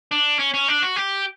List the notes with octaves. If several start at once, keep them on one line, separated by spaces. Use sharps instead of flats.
D4
C#4
C#4
D4
F#4
G4